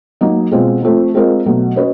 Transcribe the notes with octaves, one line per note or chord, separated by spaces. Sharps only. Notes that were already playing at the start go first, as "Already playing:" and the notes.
F#3 A#3 D#4
B2 G#3 C4 F4
F3 A3 C4
G#3 C4 F4 A#4 D#5
B2 F#3 A3
C#4 F#4 B4 D#5